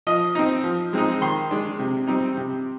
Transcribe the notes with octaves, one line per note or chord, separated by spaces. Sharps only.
F3 D#5
C4 D#4
F3
G#3 C4 D#4
D#3 C6
G#3 D4
C3
G3 C4 D#4
C3